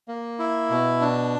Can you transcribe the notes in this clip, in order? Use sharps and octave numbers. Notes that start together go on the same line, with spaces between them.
A#3
E4
B2
D4